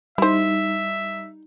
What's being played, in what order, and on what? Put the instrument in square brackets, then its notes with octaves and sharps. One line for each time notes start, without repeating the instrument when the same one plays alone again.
[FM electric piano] G3 D#4 [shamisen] E4 C5 [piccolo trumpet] E5